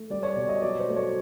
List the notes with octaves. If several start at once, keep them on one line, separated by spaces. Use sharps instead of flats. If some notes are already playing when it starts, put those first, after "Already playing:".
Already playing: A3
G3 D5
C#5
B2 D5
D#5
F#3 D5
C5
A3
C#5